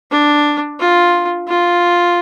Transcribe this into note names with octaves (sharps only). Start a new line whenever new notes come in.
D4
F4
F4